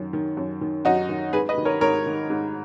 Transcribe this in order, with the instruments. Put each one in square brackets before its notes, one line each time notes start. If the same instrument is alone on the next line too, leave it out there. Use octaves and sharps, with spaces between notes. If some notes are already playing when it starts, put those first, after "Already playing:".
Already playing: [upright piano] F#2 D#3
D#3
F#2
D#3
F#2 D#4 F#4
D#3
G#2 G#4 B4
B4 D#5
D#3
A#4 C#5
G#2 A#4 C#5
D#3
G#2